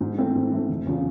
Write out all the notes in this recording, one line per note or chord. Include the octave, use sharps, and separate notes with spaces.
G#2
E3 A3 C4
G#2
E3 A3 C4
F1
E2 C#3 F3